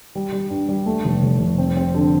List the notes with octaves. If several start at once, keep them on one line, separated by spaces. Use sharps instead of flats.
G3
G3
G2
G3
A3
F1
F1
F1
C4
C4
D3